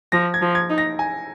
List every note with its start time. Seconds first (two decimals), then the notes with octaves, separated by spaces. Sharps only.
0.12 F3 A#6
0.34 G#6
0.42 F3
0.55 G#6
0.70 D#4
0.78 A#6
0.99 G#5